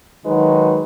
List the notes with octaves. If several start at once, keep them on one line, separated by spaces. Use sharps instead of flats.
D#3 F#3 G#3 D#4 F#4 B4